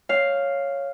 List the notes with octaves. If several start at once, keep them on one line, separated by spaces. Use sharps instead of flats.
C#5 F5